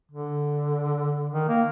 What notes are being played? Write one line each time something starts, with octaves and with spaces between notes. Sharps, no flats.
D3
D#3
A#3